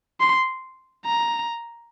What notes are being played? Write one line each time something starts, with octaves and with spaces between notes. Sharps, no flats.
C6
A#5